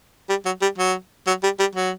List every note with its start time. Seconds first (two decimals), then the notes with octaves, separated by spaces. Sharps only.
0.29 G3
0.45 F#3
0.62 G3
0.78 F#3
1.27 F#3
1.43 G3
1.59 G3
1.76 F#3